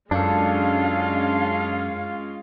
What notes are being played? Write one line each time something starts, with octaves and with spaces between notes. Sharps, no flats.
F#2 G#3 C#4 D4 F4 A4 F5